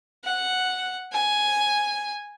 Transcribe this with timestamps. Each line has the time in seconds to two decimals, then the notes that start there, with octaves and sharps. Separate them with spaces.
0.24 F#5
1.12 G#5